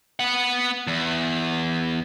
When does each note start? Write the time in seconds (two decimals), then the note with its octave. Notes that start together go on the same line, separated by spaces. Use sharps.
0.20 B3 F#5
0.87 E2